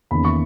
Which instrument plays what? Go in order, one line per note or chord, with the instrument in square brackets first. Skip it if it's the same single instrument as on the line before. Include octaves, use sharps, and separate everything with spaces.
[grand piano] E2 D#3 A#3 C#4 B5
C#6